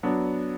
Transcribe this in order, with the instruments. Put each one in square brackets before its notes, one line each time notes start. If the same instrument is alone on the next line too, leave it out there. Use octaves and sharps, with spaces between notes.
[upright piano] F#3 B3 D4